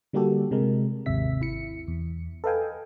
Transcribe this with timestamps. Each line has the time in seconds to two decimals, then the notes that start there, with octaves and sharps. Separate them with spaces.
0.13 D3 G3 A#3 F#4 G4 A4
0.51 C3 G#3 A#4
1.06 G#1 D#2 C3 E5 B6
1.42 E4 C#7
1.88 E2
2.44 A4 B4 D#5 F5 G5 G#5